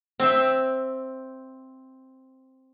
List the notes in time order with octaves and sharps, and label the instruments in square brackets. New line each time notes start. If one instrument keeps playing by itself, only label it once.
[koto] C4 E5